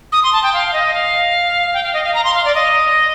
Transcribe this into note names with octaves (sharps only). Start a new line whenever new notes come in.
D#6
C6
A5
G5
F5
F5
D#5
F5
G5
F5
D#5
F5
A#5
C6
F5
D5
D#5